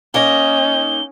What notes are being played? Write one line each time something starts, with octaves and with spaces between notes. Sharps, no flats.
A#3 C#4 D#4 G7